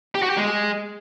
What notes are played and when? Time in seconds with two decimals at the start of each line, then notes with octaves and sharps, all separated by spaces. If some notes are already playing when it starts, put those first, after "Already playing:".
0.15 G4
0.22 F#4
0.30 G4
0.37 G#3